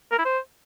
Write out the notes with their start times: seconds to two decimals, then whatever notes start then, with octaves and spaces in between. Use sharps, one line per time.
0.12 A#4
0.19 E4
0.25 C5